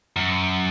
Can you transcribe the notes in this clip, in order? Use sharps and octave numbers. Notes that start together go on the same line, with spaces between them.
F#2